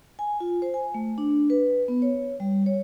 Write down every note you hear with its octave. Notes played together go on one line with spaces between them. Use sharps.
G#5
F4
C5
G#5
A3
D4
B4
B3
C#5
G3
C#5